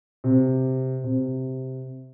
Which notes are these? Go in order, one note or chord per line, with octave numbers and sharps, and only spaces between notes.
C3
C3